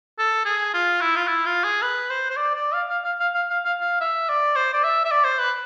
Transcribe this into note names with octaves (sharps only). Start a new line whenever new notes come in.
A4
G#4
F4
E4
F4
E4
F4
G#4
B4
C5
C5
D5
D5
F5
F5
F5
F5
F5
F5
F5
F5
E5
D5
C5
D5
E5
E5
D5
C5
B4